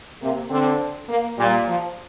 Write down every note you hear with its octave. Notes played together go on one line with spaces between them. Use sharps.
C3 A#3
D3 C4
A#3
A#2 G3
F3